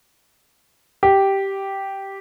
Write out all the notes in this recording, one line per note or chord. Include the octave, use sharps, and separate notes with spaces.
G4